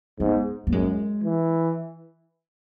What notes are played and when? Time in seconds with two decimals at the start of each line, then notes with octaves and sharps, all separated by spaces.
0.20 G#2 B3
0.67 A#3
0.72 F#2 G#3
1.24 E3